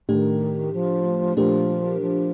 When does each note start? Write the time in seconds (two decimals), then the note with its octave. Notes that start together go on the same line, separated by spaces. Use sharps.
0.08 A2 D#3 A3 D4 G4
0.73 F3
1.37 A#2 F3 A3 D4 G4 A#4
2.01 F3